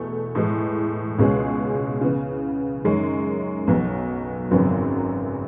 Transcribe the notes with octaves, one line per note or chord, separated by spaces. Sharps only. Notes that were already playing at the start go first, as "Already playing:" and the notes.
Already playing: E2 B2 A3
A2 E3 G#3
C#2 B2 G#3 C#4 G#4
C#3 E3 B3
F#2 D#3 G#3 C#4
B1 B2 F#3 B3
G#1 F#2 C#3 F#3 B3